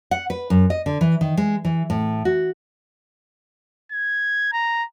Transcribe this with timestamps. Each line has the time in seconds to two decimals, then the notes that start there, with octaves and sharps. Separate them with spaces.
0.11 F#5
0.30 B4
0.50 F#2
0.70 D#5
0.86 D3
1.01 E3
1.21 D#3
1.37 G#3
1.65 E3
1.90 A2
2.25 F#4
3.92 G#6
4.53 A#5